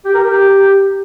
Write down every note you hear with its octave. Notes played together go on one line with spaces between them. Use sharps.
G4
A#4
G4